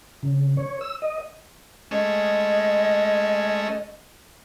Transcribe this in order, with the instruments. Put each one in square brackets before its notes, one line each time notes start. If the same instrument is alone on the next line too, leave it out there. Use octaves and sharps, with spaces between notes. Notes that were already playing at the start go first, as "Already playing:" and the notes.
[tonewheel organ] C#3
C#5
E6
D#5
[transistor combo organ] G#3 A3 C#4 [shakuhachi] D#5